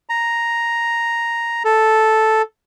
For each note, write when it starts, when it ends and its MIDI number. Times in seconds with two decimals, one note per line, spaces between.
0.09 1.63 82
1.65 2.42 69